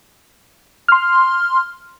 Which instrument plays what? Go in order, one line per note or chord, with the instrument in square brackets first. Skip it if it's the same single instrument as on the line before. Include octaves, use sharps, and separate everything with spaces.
[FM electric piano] C6 F6